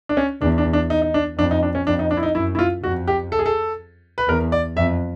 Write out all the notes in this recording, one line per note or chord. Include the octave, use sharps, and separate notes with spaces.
D4
C#4
E2 D4
D4
D4
D#4
D#4
D4
F2 D4
D#4
D4
C#4
F2 D4
D#4
D4
E4
D#4
F#2 E4
E4
F4
F2 F#4
G4
A4
G#4
A4
B4
E2 A#4
D5
F2 E5